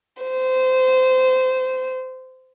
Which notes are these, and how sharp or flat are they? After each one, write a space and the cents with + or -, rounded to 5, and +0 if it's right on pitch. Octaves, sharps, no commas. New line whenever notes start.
C5 -20